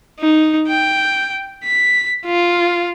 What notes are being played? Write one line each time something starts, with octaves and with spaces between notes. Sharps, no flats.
D#4
G5
B6
F4